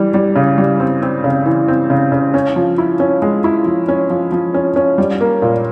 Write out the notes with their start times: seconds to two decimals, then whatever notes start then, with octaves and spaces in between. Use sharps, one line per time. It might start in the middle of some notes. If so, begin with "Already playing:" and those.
Already playing: E3 G3
0.14 G3
0.36 C#3
0.58 G3
0.80 C4
1.02 C4
1.24 C#3
1.46 E3
1.68 C4
1.90 C#3
2.12 C#3
2.34 C#4
2.56 F3
2.78 E4
3.00 C#4
3.22 G#3
3.44 E4
3.66 F3
3.88 C#4
4.10 F3
4.32 F3
4.54 C#4
4.76 C#4
4.98 G3
5.20 A#3
5.42 A#2